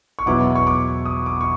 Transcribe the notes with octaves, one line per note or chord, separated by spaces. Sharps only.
C#6
E2 B2 F#3 B3 E4 D6
C#6
D6
D#6
D6
C#6